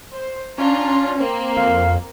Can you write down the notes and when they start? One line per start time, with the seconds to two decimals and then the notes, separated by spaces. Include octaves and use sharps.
0.12 C5
0.58 C#4 D4 F4 A#5
1.19 A#3 C4
1.57 F2 F5